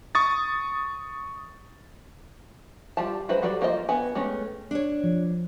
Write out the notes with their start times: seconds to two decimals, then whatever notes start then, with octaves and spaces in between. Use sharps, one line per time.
0.15 C#6 D#6 A6
2.97 G3 F4 G4 A5
3.29 F#3 G#3 B4 C5 B5
3.43 F#3 G3 A4 D5
3.61 F3 A#3 F4 C5 D#5
3.89 B3 G#5
4.15 G#3 A3 B3 C#4
4.71 D4 C#5
5.04 F3